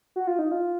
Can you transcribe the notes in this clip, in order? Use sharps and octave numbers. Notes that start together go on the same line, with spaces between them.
F#4
F4
D#4
F4